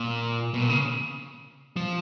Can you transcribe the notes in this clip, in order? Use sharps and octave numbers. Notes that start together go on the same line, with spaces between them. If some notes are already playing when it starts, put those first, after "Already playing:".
Already playing: A#2
B2
A#2
C#3
F3